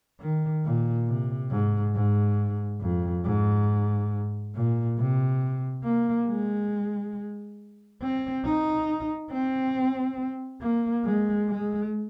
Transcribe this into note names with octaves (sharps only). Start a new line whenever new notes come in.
D#3
A#2
C3
G#2
G#2
F2
G#2
A#2
C3
A#3
G#3
C4
D#4
C4
A#3
G#3
G#3